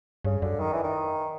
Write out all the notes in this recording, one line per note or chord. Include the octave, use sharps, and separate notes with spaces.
G2 C#3
F#2 D3
D#3
E3
D#3